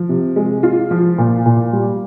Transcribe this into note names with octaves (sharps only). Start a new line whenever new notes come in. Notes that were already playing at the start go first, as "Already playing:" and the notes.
Already playing: F3
C3
G#3
F4
F3
A#2
A#2
G3